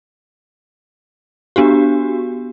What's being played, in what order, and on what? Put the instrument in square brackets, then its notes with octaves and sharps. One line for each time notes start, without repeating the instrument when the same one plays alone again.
[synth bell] B3 D4 F#4 G4